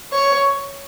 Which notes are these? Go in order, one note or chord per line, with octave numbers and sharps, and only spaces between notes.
C#5